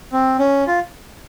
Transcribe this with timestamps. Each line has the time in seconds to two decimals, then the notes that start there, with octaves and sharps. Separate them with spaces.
0.12 C4
0.39 C#4
0.67 F4